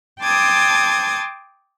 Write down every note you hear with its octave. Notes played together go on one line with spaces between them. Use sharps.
G5 A5 C6 D6 D#6 G#6